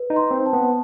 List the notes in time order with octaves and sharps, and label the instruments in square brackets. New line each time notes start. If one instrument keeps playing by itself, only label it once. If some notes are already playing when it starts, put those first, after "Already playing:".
Already playing: [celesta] B4
[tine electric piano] D#4
[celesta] C6
[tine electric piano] C4
[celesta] A5
[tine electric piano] B3